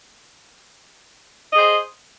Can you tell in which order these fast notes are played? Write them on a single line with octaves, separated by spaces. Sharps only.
D#5 G#4 C5